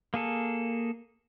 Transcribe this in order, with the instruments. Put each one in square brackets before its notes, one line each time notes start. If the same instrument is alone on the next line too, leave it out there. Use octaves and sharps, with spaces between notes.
[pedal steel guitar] A#3 G#4 A4